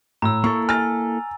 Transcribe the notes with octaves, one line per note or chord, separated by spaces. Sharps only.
A2 A#5 E6
A#3 E4 A4 C#6
G#5 F6 A6